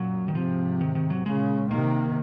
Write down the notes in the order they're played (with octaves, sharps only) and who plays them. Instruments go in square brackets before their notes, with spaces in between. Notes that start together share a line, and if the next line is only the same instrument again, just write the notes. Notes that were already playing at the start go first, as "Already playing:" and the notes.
Already playing: [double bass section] F#2 A#2 [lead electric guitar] F#3
[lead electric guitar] D#3
[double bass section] G#2 C3 [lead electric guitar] F3
[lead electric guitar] D#3
D#3
F#3
[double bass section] A#2 C#3 [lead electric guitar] G#3
[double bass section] C3 D#3 [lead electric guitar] A#3